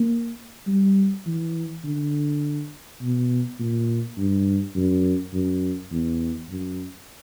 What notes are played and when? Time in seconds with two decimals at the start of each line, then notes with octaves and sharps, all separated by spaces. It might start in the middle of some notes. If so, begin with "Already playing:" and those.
Already playing: A#3
0.67 G3
1.26 E3
1.84 D3
3.01 B2
3.59 A#2
4.17 G2
4.75 F#2
5.33 F#2
5.91 E2
6.49 F#2